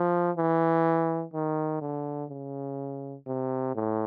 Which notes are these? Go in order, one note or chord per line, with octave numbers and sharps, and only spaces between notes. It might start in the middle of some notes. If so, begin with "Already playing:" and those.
Already playing: F3
E3
D#3
D3
C#3
C3
A2